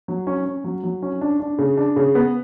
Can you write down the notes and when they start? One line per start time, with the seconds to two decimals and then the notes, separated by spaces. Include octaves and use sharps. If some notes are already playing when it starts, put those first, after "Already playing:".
0.08 F#3
0.27 C#4
0.46 C#4
0.64 F#3
0.83 F#3
1.02 C#4
1.21 D4
1.40 D4
1.58 C#3
1.77 D4
1.96 C#3
2.15 B3